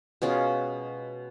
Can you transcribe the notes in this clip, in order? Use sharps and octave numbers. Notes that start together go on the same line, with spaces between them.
B2 G#3 C#4 F4